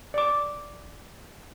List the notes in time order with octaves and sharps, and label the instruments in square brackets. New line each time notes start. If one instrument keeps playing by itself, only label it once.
[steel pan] D5 D6